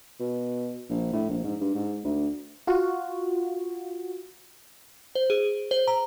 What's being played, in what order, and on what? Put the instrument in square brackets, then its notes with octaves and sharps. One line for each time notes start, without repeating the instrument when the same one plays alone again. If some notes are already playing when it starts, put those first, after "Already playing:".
[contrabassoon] B2
A#1
A2
A#1
G#2
G2
G#2
D2
[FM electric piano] F4 F#4
[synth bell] C5
G#4
C5
A#5